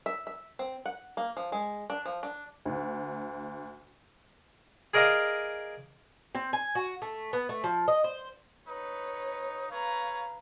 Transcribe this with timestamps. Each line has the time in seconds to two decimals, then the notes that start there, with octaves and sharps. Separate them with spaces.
0.06 E5
0.27 E5
0.59 C4
0.86 F#5
1.17 A#3
1.37 F3
1.52 G#3
1.90 D4
2.06 F3
2.23 D4
2.65 D2
4.94 G#4 A#4 D5 D#5 F5 A#5
6.35 C4
6.53 G#5
6.75 F#4
7.02 A3
7.33 B3
7.49 A3
7.64 F3
7.88 D#5
8.04 C5
8.68 D#4 B4 C#5
9.72 B4 C#5 F5 A#5